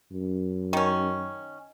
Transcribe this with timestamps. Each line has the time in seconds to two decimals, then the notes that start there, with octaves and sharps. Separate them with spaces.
0.12 F#2
0.73 D#3 C#4